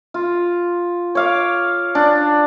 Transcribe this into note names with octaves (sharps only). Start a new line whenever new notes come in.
F4
C#5 F5 D6
D4